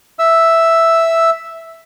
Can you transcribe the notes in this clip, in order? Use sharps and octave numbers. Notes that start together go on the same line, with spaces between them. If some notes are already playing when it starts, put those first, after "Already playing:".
E5 E6